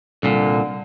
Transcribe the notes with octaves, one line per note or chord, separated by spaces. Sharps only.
C2 A#2 D3